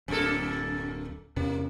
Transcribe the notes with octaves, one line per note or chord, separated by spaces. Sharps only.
D1 F#2 A#3 A4
E2 C3 A#3 C#4